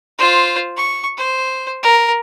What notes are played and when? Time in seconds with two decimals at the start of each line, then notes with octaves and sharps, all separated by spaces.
0.18 F4 C5
0.77 C#6
1.17 C5
1.83 A#4